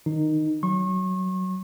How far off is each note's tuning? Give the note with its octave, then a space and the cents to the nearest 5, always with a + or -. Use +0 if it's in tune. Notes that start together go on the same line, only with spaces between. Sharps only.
D#3 +0 D#4 -15
F#3 +15 C#6 -35